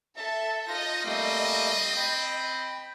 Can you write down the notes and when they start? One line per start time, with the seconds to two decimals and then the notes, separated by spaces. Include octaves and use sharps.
0.17 A4 E5 A5
0.68 D#4 F4 D#5 A#6
1.05 G3 A3 A#3 C4
1.97 G5 B5